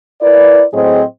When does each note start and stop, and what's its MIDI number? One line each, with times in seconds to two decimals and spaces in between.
0.21 0.63 64
0.21 0.63 70
0.21 0.63 71
0.21 0.63 74
0.74 1.03 45
0.74 1.03 54
0.74 1.03 60
0.74 1.03 68
0.74 1.03 72
0.74 1.03 75